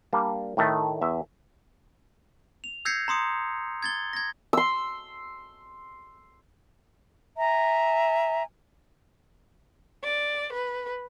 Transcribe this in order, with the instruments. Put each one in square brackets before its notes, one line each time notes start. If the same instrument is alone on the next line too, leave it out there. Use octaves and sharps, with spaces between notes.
[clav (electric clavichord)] G3 A#3 D4
A2 D#3 A3
E2 E5
[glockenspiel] F7
E6 G6 G#6 A#6 C7 C#7
A#5 C6 D#6 C#7
G#6 A6 G7
G#6 A#6
[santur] C6 E6
[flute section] E5 G#5 A#5
[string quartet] D5
B4